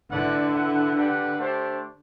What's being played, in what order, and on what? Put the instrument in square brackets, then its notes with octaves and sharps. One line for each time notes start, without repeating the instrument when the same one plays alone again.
[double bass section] D3 [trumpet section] A3 E4 B4 D5 F#5
[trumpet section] E4 B4 F#5
D4 G4 B4 F#5
A3 D4 G4 C5